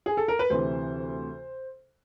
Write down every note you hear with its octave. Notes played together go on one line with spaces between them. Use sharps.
G#4
A4
A#4
B4
D2 C3 E3 C5